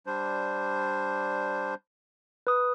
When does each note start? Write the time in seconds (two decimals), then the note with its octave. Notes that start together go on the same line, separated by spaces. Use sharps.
0.06 G3 D4 C5
2.47 B4 D#6